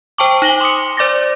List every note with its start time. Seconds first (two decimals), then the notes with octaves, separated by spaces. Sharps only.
0.18 C5 G5 A5 C#6 D6
0.42 D#4 A#6 F#7 G7
0.61 C6 D6 D#6 C#7
0.97 C5 D5 D6 A6 A#6